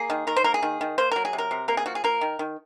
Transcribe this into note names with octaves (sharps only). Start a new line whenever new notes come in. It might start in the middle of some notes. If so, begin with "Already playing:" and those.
Already playing: A#3 G#4
D#3
D#3 A#4
C5
A#3 A#4
G#4
D#3
D#3
A#3 C5
F#3 A#4
G#4
C3
A#4
C3
A#3 A#4
G#4
F3 F#4
G#4
A#3 A#4
D#3
D#3